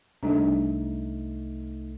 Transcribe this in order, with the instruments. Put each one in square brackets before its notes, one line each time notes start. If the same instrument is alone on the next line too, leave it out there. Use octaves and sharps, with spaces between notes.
[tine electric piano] C2 A3 D#4 [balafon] G3 D4